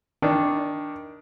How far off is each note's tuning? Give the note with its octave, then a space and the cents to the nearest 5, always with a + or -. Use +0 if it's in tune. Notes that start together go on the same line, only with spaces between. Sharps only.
D#3 +15 D4 +0